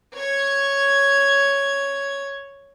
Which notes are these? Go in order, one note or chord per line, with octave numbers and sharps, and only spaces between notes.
C#5 G#6